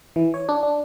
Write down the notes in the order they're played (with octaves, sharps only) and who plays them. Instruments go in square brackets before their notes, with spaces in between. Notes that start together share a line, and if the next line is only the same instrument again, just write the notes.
[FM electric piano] E3
C#5
D4
D4